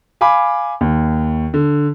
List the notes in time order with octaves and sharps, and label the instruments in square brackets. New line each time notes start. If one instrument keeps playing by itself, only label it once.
[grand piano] F5 G#5 B5 D6
D#2
D3